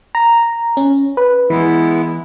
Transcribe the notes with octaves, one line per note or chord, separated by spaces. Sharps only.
A#5
C#4
B4
E3 G#3 B3 E4